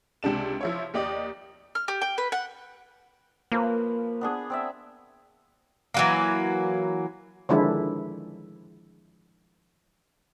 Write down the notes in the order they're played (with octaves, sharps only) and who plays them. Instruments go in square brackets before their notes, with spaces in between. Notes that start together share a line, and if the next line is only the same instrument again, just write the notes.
[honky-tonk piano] C#2 C3 D4 E7
F3 E4 C#5
D#2 G4 D5 D#5
[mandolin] F6
G4
G5
B4
F#5
[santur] F3 B4 [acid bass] A#3
[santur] B3 D4 G#4
C4 D5 E5
[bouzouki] E3 F#3 A#3
[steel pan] D3 D#3 F3 G#3 D4 E4